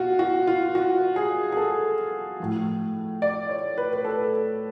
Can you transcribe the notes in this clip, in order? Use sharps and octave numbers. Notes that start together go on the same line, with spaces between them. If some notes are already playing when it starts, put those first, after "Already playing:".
Already playing: B2 F4 F#4
F#4
F4
F#4
G#4
G#4
A4
A2 F3
D5
C#5
B4
B4
A4